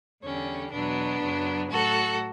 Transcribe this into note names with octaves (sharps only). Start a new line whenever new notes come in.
E2 D3 G3 C#4
E2 B2 F#3 B3 D4
F#2 C#3 F#3
A2 F#3 F#4 A4